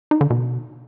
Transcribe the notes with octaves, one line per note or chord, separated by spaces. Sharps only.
D#4
D3
B2